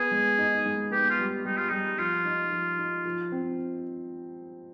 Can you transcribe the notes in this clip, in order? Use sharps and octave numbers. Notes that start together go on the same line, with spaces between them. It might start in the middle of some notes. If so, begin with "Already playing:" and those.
Already playing: B3 G#4
G#3
D#4
G#3
B3 G4
F4
G3
G3 D#4
F4
G3 D#4
F3 F4
D#4
F3
D#4
F3
C4